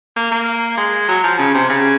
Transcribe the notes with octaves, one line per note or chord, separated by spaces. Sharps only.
A#3
A#3
G#3
F#3
F3
C#3
C3
C#3